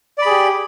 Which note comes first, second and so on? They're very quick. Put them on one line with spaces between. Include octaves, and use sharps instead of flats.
D5 B5 G#4 G4